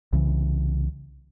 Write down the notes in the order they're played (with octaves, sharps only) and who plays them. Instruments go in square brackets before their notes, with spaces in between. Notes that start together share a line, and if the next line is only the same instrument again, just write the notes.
[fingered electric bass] C2 C#3 E3